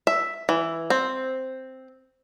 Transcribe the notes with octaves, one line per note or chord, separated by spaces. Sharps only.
E5
E3
C4